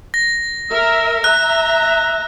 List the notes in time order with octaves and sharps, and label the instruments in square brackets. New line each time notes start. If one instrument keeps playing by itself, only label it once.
[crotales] A#6
[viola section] A#4 E5
[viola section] E5 A#5 [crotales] F#6